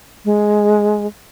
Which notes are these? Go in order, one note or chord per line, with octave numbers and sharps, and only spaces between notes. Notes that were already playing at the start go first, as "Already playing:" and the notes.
G#3